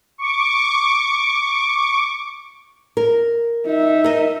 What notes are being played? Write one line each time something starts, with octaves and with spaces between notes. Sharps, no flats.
C#6 D6
A#4
D#4 E5
A#4 D#5